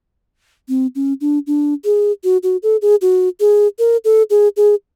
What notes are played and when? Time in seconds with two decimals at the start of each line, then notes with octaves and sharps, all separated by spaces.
0.69 C4
0.95 C#4
1.21 D4
1.47 D4
1.85 G#4
2.24 F#4
2.43 F#4
2.63 A4
2.82 G#4
3.01 F#4
3.40 G#4
3.79 A#4
4.05 A4
4.30 G#4
4.57 G#4